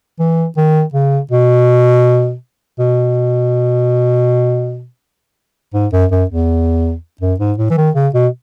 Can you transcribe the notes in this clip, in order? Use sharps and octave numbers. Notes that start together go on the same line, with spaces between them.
E3
D#3
C#3
B2
B2
G#2
F#2
F#2
E2
F#2
G#2
A2
E3
D#3
C#3
B2